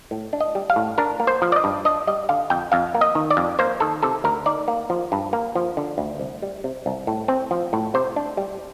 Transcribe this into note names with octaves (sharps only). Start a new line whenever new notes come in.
A2
D4
D#5
G3
F5
A2
D4 A#4
A#3
C5
F3
D5
D#5
G2
D4 D#5
G3 D#5
D3 F5
F2 G5
F2 F5
A#3
D#5
D#3
D5
F2
A#3 C5
D#3 A4
C3 A4
D2 A#4
D#4 D5
A#3
F3
G2
A#3
F3
D3
D2
C2
G3
C3
C2
A2
C4
F3
A2
C3 C5
D4
G3